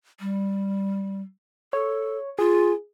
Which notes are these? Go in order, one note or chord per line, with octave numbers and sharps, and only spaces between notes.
G3
A4 C#5
F4 G#4